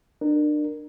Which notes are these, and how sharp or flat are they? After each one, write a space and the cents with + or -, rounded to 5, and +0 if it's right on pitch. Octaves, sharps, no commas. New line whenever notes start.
D4 +35 A#4 +0